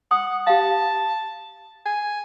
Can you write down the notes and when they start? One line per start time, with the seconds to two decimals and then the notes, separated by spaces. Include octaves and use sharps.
0.11 F#5 D#6
0.47 G4 F5 A5
1.86 G#5